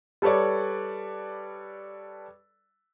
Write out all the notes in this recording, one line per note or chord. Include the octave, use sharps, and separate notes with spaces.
G3 A4 B4 C#5 D5